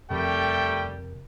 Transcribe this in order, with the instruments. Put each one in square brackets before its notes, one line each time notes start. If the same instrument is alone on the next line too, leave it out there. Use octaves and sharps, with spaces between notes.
[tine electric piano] F2 C3 A#4 [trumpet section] G3 A3 G5